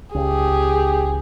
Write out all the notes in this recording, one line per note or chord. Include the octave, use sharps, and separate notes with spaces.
C#2 G4 G#4